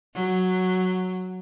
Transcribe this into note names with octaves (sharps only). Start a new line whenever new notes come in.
F#3